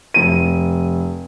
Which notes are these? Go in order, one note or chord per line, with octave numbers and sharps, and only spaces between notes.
F1 D#7